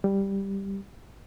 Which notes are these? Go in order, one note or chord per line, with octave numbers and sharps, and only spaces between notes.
G3